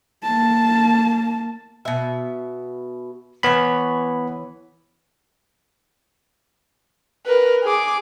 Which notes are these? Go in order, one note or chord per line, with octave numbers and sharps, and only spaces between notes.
A#3 A5
B2 E5
E3 B3 C#5 B5
A#4 B4
G#4 D6